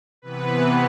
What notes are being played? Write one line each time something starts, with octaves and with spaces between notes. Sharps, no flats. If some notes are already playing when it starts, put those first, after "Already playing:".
C3 E3 B3 B4